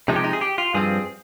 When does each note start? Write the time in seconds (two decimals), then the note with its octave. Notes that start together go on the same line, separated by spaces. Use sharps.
0.08 C3 F3 G#3 D#4
0.16 G4
0.24 D#4
0.33 G#4
0.41 G4
0.58 F4
0.74 G2 F3 C4 G#4